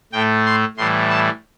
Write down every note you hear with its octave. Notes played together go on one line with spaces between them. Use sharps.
A2 A3 G5
C6
A2 E3 G3 C6
A5